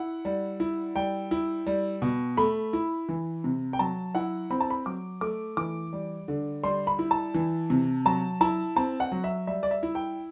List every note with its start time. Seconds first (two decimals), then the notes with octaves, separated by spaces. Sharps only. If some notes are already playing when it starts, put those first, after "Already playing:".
Already playing: E4 F#5
0.25 G3
0.60 E4
0.96 G3 G5
1.31 E4
1.67 G3
2.02 B2
2.37 A3 B5
2.73 E4
3.09 E3
3.44 C3
3.73 G5
3.79 F#3 A5
4.15 E4 F#5
4.50 C4 B5
4.60 A5
4.70 B5
4.86 F#3 D6
5.21 A3 D6
5.57 E3 D6
5.93 G3
6.28 D3
6.63 G3 C6
6.87 B5
6.99 E4
7.11 A5
7.34 E3
7.70 C3
8.05 F#3 A5
8.41 E4 A5
8.76 C4 A5
9.00 F#5
9.12 F#3
9.24 E5
9.47 G3 E5
9.63 D5
9.71 E5
9.83 E4
9.95 G5